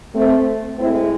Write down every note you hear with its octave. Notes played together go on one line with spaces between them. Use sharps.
A3 C4
A2 G#3 C4 E4